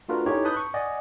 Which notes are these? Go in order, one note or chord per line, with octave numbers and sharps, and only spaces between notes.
A3 D4 F4 F#4 A#4 B4
C#4 D#4 E4 G4 A4 C#5
B4 A5 B5 D#6 F#6 G6
C#6
D5 D#5 F#5 G#5